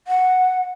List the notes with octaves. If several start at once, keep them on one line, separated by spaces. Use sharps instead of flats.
F#5